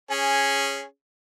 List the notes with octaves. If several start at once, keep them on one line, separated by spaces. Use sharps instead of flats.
C#4 G#4